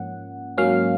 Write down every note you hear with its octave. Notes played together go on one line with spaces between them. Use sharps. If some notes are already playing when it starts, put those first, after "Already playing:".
Already playing: G#2 F3 A#3 C#4 F#5
G#2 F#3 A#3 C#4 F5